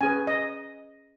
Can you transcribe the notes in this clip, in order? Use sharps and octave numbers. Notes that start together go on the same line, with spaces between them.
C#4 G#4 B4 G#5
D#5